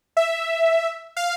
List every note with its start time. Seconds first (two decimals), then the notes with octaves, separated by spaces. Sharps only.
0.17 E5
1.17 F5